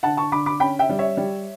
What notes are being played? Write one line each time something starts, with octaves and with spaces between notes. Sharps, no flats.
D3 F#5 A5
A5 C#6
D3 B5 D6
B5 D6
C#4 G5 B5
E5 G5
G3
C#5 E5
G3